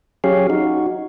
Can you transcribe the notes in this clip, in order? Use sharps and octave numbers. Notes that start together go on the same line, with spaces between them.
F#3 C#4 G4 G#4 C#5 F5
D#4 F#4